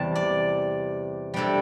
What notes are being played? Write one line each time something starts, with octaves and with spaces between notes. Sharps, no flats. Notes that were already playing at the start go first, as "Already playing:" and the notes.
Already playing: E2 C3 G3 A5
D5
C3 G3 D4 A4